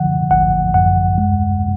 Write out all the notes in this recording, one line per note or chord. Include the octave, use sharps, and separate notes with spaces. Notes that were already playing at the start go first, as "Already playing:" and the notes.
Already playing: D3 F3 F#5
G#1 F#5
F#2 F#5
G#3